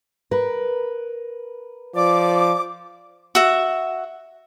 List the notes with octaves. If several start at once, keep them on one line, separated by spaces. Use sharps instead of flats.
A#4 B4
F3 D5 D6
F#4 E5